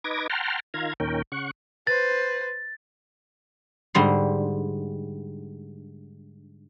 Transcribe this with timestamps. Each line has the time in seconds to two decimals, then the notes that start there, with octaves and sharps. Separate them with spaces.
0.04 D#4 B4 D6 G#6 A#6
0.30 F#5 G5 A5 A#5 C6 F6
0.74 D#3 F4 F5 A#5 G#6
1.00 D#2 A#2 D#3 C#4 A#4 G5
1.32 C#3 F#5 C#6
1.87 B4 C5 A6
3.95 G#2 D3 G3 C6